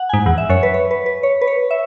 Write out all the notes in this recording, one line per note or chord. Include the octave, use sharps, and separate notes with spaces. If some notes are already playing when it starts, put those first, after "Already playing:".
Already playing: F#5
G#5
G#2
E2 F#5
E5
F#2 C#5
B4
C#5
B4
B4
C#5
B4
C#5
E5